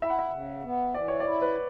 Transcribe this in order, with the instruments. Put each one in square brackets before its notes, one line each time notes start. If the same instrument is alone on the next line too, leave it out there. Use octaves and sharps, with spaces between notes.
[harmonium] E4 [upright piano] E5
[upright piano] F#5
E5
[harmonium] C#3
B3
[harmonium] E3 [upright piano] D5
[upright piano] C#5
D5
[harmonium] E4
[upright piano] B4